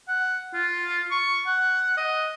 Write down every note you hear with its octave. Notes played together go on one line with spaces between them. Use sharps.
F#5
F4
C#6
F#5
D#5